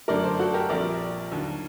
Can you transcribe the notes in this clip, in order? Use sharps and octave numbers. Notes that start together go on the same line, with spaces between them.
G1 F#2 D3 A3 A#4 D5
A4 C5
F#4 A4
G4 A#4
A#1 A#2 G3 C4 A#4 D5
D#2 D3 F#3